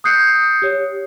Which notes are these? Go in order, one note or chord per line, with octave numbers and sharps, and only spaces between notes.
D#6 F#6 G6 C7 C#7
G4 C#5